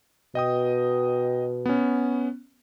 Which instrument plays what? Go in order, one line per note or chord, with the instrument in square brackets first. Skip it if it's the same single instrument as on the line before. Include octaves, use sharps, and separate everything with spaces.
[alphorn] B2 [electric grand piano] D#5 G5 D#6
[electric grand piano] B3 C#4